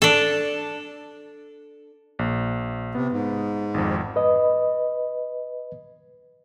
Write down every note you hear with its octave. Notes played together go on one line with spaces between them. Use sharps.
D4 A4
A#1
C3 B3
G#2
G#1 F2
B4 D#5